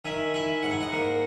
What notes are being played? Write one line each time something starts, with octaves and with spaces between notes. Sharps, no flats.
D#3 E5 G#5
E4 E5 G#5
G#2 F#5
G#5
D#5 F#5
A#3